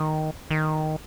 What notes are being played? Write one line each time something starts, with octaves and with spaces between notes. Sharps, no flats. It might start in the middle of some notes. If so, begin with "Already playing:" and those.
Already playing: D#3
D#3